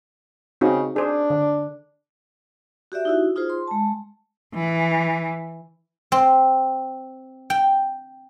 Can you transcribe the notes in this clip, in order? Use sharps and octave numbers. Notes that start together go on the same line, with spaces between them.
C#3 C4 D#4 F#4
D4 G#4 C5
D3
F#4 G4 D5 E5
D#4 E4 F#4
D#4 F4 G#4 C5
C6
G#3 A5
E3
C4
G5